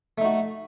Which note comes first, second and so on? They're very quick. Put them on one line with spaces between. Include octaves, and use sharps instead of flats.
A3 D#4 F#4